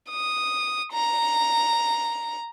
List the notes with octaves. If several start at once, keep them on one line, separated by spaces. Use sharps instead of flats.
D#6
A#5